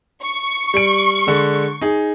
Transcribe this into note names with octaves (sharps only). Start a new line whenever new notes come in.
C#6
G3 D7
D3 G#3
D#4 G#4